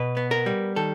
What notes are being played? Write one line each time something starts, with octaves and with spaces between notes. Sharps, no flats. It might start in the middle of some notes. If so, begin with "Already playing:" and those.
Already playing: B2 B4
B3
A#4
G3
D#3 A4